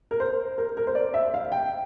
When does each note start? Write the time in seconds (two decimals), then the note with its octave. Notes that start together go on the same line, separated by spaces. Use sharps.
0.11 A#4
0.20 C5
0.58 A#4
0.77 A#4
0.87 C5
0.95 D5
1.14 E5
1.34 F5
1.52 G5